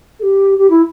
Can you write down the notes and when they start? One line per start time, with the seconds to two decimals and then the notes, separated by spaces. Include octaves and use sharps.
0.19 A4
0.22 G4
0.58 G4
0.70 E4